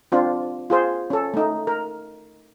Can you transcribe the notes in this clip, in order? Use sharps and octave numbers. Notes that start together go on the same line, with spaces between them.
C4 D4 F4
F4 G#4 C5
C#4 A4
A3 D#4
A#4